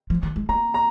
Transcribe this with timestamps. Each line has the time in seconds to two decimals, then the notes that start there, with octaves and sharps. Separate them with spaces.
0.10 F3
0.23 D#3
0.36 G#3
0.49 A#3 A#5
0.74 A#5